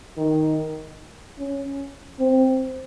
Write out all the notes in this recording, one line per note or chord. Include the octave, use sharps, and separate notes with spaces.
D#3
C#4
C4